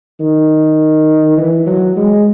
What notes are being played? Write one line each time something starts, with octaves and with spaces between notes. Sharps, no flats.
D#3
E3
F#3
G#3